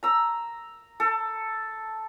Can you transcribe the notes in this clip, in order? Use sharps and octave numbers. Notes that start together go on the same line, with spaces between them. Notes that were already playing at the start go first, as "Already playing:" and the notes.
A#5 E6
A4